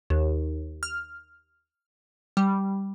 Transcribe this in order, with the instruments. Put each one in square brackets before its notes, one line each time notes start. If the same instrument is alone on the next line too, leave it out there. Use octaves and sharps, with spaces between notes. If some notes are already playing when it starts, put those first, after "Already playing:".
[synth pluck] D#2
F6
G3